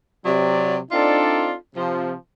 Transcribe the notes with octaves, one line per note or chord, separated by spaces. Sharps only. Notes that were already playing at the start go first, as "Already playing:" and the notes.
C3 F#3 D5
C4 D4 D#4 F4 A4 D5
C3 F3